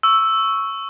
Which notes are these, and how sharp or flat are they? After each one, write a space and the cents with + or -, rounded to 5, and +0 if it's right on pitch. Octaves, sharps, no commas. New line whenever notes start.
C#6 +0 E6 +0